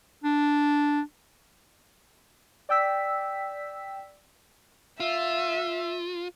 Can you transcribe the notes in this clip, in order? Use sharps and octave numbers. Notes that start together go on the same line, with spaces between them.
D4
D5 G5 E6 B6
F4 E5